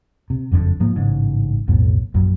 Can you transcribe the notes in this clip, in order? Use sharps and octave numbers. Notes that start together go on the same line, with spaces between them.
C3
F#1 F2 A2 D3
G#2 F3 A#3
A1 G#2 C#3
B1 F2 A2 B3
A#1 F#2